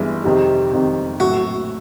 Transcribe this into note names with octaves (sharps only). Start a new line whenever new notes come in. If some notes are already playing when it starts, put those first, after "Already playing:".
Already playing: G1 G2 E3 G#3
F2 C3 D#3 G3
F2 C3 D#3 G3
A#1 A2 F#3 A3 F#4